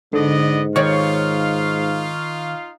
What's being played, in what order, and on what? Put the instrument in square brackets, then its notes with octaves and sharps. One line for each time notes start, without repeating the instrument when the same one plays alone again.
[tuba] G#2 [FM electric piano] D3 [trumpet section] B3 D5 D#5
[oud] D#3 C#5 D5 [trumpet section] D#4 F4 F5 [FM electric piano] C#6